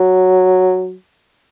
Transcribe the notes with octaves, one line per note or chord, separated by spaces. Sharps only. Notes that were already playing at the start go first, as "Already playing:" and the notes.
Already playing: F#3